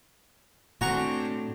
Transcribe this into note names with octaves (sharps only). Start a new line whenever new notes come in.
A2 C4 D4 F#4 G#5 A#5 C#6